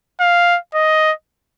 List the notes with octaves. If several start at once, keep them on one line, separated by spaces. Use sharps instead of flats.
F5
D#5